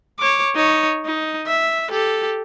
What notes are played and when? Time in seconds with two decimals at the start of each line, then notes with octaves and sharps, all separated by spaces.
0.19 C#5 D6
0.55 D#4 C#5
1.05 D#4
1.47 E5
1.90 G4 A4